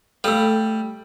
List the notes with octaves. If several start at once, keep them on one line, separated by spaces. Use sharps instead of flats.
G3 A3 A4 F5 E6